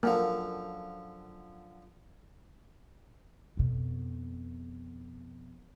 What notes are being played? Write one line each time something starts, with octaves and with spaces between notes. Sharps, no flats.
F#2 D3 F3 A#3
F2 B2